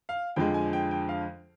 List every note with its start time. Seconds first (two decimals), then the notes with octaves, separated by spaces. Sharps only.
0.09 F5
0.36 F2 D3 F3 G#3 G5
0.54 G#5
0.73 G5
0.91 G5
1.09 F5